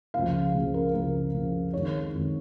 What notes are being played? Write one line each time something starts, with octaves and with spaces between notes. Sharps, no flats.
C#2 C#3 F3 F5
C#2 C#3 F3
A#4
C#2 C#3 F3 A#4
C#2 C#3 F3
F2 D#3 G#3 C#5
F2 D#3 G#3